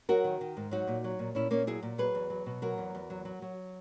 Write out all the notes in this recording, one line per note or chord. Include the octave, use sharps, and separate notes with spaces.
F#3 F#4 A#4
D#3
D#3
G#2
F#3 D#4 F#4
A#2
F#3
A#2
A#2 C#4 E4
A#2 A#3 C#4
F#3 E4 G#4
A#2
F#3 G#4 B4
E2
F#3
B2
F#3 F#4 A#4
E2
E2
F#3
F#3
F#3